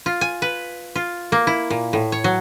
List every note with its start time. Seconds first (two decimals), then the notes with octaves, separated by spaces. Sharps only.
0.06 F4
0.21 G#5
0.42 B4
0.95 F4
1.32 A#3
1.47 E4
1.70 A#2
1.93 A2
2.12 C#5
2.24 F#3